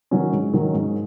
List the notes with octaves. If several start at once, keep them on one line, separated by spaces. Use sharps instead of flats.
D#3 F#3 C#4
G#2
D#3 F#3 C#4
G#2